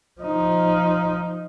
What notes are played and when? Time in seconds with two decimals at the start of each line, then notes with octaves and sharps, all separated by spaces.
0.21 F3 D#4